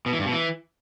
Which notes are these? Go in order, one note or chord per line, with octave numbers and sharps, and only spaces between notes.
B2
E3
G2
B2
E3